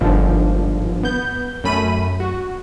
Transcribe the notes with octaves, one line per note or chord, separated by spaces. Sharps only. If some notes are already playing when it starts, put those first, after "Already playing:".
G1 G#2 D3 D#3 F3
B3 G6
F#2 A3 B5 D#7
F#4